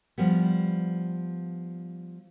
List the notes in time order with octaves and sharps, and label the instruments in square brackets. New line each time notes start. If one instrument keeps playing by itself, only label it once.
[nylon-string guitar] F3 G3 B3